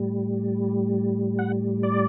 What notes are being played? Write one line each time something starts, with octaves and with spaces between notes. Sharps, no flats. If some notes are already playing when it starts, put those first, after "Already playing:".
Already playing: A2 G3
F#5
D5